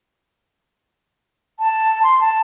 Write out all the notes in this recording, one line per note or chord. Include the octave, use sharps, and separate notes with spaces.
A5
C6
A5